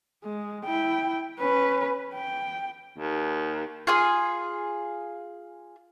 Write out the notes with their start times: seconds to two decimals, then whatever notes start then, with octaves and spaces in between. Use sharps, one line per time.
0.24 G#3
0.65 E4 G5
1.39 C#4 B4
2.14 G5
2.99 D#2
3.87 F4 G#4 D#6